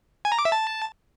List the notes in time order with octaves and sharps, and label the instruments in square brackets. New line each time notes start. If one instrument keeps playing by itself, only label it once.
[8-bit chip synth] G#5
A#5
D6
E5
A5